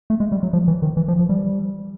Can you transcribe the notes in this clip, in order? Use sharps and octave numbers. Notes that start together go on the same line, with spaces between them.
A3
G#3
G3
F#3
F3
E3
D#3
E3
F3
F3
G3